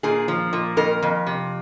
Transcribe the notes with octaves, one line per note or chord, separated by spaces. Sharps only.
A#2 G#4
F3
A#2
F2 A#4
F2
C3